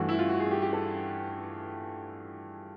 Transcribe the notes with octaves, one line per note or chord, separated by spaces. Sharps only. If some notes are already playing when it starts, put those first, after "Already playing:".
Already playing: G2 E3 A3 F#4
E4
F4
F#4
G#4
G4
G4
A4